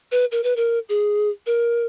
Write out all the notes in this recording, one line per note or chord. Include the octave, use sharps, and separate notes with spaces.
B4
A#4
B4
A#4
G#4
A#4